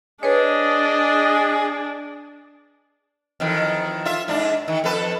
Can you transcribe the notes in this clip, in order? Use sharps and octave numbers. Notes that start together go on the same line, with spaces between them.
D4 G#4 B4 C#5 D#5
F2 D#3 E3
F4 E5
G#2 D4
D#3
F2 A4 B4